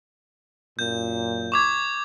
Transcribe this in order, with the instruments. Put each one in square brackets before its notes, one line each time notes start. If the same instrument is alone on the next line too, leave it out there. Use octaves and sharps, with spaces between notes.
[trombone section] F#2 A#2 [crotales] G6
[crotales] C#6 D6 G#6